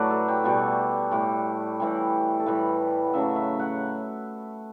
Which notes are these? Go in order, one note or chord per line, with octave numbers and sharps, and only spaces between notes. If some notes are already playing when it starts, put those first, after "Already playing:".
Already playing: A2 F#3 A3 B4 D5
A4
G4
B2 G3 F#4
A2 G3
A2 E3 G3
A4
A2 E3 G3 B4
F#5
C#3 F#3 A3 E5
E5
F#5